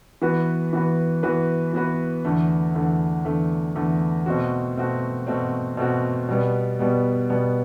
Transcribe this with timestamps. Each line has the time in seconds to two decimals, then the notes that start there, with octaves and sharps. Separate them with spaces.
0.22 E3 B3 F#4 B4
0.73 E3 B3 F#4 B4
1.23 E3 B3 F#4 B4
1.73 E3 B3 F#4 B4
2.25 E2 D3 A3
2.74 E2 D3 A3
3.25 E2 D3 A3
3.76 E2 D3 A3
4.26 B2 A3 C4 F#4
4.77 B2 A3 C4 F#4
5.27 B2 A3 C4 F#4
5.77 B2 A3 C4 F#4
6.28 B2 G3 B3
6.79 B2 G3 B3
7.30 B2 G3 B3